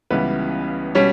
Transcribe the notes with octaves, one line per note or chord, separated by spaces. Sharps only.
C#2 C#3 E3 G3 B3 B4
B2 G3 C#4 C#5